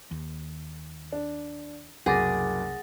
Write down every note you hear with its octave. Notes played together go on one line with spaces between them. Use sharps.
D#2
D4
F#1 C2 G#4 F#5 D6 A6 A#6